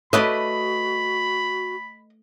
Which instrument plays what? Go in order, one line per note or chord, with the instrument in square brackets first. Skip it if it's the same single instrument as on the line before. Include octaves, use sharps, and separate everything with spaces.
[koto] A3 B4 D5 [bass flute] F#4 [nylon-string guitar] D#5 [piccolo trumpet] B5